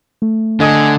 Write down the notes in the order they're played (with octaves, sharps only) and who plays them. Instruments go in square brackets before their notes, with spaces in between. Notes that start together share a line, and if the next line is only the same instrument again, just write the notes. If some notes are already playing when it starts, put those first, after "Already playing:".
[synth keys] A3
[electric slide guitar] D3 [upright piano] A4 D#5 D#6 [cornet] G#5